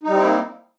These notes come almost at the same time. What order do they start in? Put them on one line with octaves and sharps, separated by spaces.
D#4 G3 C4 E4 A#3